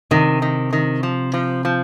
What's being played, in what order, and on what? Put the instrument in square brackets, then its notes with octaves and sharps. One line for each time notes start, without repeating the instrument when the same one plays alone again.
[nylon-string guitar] C3 [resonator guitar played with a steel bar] D#3
[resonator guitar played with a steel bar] D#3
D#3
F3
F3
F3